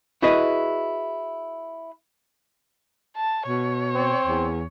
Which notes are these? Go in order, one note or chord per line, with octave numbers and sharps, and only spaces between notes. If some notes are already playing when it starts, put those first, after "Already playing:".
E4 F#4 G#4 B4 D#5
A5
B2 C#5
C4
E2